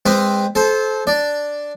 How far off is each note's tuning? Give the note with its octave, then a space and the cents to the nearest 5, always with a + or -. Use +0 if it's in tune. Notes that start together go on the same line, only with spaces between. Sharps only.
G#3 -30 C4 +0 B4 +0
A4 -30 C5 +0
D4 +0 D5 +0